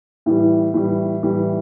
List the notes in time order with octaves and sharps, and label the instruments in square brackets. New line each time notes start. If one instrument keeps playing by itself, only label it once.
[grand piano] A2 E3 G3
A2 E3 G3
A2 E3 G3